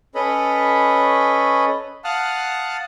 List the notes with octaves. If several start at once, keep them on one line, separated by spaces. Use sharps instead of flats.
C#4 A4 B4 C#5 D#5 B5
F5 F#5 A5 D#6 F6 F#6